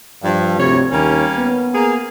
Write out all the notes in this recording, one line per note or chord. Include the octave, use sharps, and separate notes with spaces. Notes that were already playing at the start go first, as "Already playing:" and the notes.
G2 F3
D2 C3 C#5
D#2 G3 A#3 C#4
B3
A#3 G#4